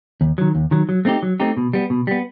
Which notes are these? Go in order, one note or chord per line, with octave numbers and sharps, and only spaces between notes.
D#2
D#3 F#3
D#2
D#3 F#3
F#3
A3 C4 D#4 G4
F#3
A3 C4 D#4 G4
B2
G3 B3
B2
G3 B3